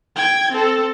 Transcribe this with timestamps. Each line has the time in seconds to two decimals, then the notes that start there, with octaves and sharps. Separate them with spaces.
0.16 G5 G#6
0.52 C4 A4